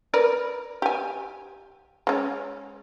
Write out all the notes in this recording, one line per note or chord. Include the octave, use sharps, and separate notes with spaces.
A#4 B4 D5
G4 G#5
G#3 C#4